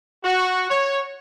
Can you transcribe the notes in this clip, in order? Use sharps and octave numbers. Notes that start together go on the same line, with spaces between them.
F#4
C#5